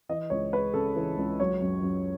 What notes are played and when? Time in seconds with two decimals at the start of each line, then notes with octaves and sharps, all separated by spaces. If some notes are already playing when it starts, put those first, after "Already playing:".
0.09 E3 D#5
0.30 C#2 C#5
0.53 G#3 B4
0.74 C#3 A4
0.96 E3
1.18 C#2
1.40 F#3 C#5
1.61 F#2
1.83 F#2